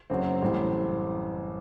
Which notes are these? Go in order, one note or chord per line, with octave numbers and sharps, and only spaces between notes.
F#1 F#2 F#3 C4
A1 A2 G3 C4